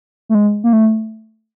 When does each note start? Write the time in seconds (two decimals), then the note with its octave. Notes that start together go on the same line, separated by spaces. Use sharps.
0.29 A3
0.35 G#3
0.64 A#3
0.73 A3